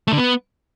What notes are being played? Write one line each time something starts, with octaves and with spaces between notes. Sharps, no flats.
A3
D3
B3